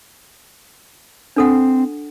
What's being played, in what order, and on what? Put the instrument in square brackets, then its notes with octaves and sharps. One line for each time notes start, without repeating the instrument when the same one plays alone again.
[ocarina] C4 [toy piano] D4 A4 F#5